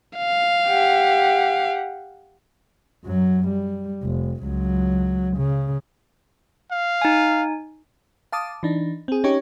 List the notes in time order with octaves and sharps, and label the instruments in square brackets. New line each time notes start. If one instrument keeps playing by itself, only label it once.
[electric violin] F5
[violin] G4 F#5
[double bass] F#2 F#3
G3
F1
C#2 F#3
C#3
[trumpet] F5
[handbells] D#4 G#5
[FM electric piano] F5 A5 D6 D#6
E3 D4 D#4
C4 G#4
C#4 D#4 G4 C#5 C#6